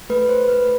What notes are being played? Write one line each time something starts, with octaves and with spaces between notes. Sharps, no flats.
A3 B4
C5
A3 B4